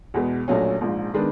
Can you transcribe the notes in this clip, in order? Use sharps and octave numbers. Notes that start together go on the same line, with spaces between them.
E2 B2 G#3
A#1 A#2 F#3 A3 C#4
A#1 G#2 F3
D#3 G#3 B3 D4